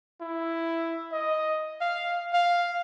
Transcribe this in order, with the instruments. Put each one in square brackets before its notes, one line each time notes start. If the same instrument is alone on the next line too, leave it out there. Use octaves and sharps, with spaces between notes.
[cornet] E4
D#5
F5
F5